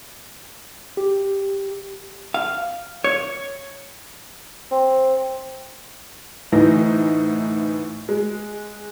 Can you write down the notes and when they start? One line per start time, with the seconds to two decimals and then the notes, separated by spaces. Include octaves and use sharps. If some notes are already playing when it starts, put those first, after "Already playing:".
0.97 G4
2.34 F5
3.04 C#5
4.72 C4
6.52 D2 A2 E3 D#4 A#6
8.09 G#3